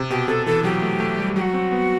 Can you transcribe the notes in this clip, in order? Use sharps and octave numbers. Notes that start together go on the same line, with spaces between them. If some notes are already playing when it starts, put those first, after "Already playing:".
Already playing: C3
B2 G4
C3 A4
E3 A4
F#3 G4
A3
A3
G3
F#3 G4
F#4
C4
B3